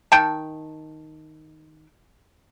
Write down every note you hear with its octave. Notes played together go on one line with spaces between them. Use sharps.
D#3 G5 A5